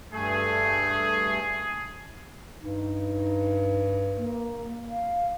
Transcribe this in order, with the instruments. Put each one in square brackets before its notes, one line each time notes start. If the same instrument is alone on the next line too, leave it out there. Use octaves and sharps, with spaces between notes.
[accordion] G2 A3 [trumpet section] G#4
[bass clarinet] G2 [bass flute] D#4
[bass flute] A#3
F5